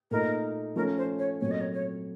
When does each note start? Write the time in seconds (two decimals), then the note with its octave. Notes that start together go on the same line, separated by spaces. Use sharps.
0.11 A#2 A3 D#4 A#4
0.76 F3 A3 C#4 A#4
0.97 C5
1.18 C#5
1.40 A#2 F#3 A3 C4 C#5
1.51 D#5
1.60 C#5
1.73 C#5